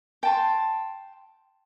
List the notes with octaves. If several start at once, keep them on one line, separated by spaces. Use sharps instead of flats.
G5 A5 C6